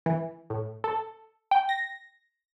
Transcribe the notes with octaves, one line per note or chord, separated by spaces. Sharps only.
E3
A2
A4
G5
A#6